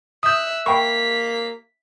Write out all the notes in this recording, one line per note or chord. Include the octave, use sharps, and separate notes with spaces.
E5 D#6 F#6 G6
A#3 G5 B5 C#6 B6